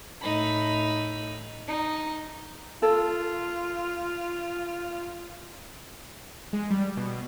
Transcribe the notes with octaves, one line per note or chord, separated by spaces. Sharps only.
A2 D#4 B5
D#4
F4 A4
G#3
G3
B2